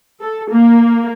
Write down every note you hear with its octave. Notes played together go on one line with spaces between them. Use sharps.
A4
A#3